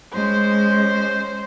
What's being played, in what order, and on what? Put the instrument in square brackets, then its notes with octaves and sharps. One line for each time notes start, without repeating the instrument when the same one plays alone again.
[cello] G#3 C#4 [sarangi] C5